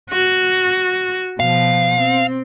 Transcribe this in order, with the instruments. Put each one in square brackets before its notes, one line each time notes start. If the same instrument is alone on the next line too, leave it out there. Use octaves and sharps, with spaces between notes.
[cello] F#4
[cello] B2 F3 [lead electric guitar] F5
[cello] C4